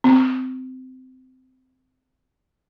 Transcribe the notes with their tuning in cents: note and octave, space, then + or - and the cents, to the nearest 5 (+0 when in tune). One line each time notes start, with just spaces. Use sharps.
C4 -20